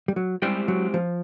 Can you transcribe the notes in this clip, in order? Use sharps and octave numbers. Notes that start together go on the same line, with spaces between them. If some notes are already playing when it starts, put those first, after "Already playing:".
G3
F#3
G3 G#3 C4 E4 G4 C5
F#3
F3